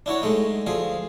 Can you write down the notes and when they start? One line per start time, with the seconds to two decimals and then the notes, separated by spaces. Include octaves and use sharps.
0.06 D4 E4 F#4 C#5
0.22 G#3 A3 D#4
0.67 D2 F3 G#4